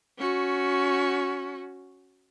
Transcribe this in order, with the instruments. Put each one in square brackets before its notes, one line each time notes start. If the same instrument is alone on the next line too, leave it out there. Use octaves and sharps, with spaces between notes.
[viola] C#4 F#4